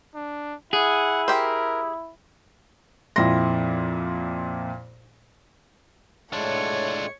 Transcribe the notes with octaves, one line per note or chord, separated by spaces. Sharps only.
D4
E4 G#4 F#5
G4 A#4 C5
F2 A#2 E4 C6 A#6
A2 G#3 D4 F4 C#5 C#6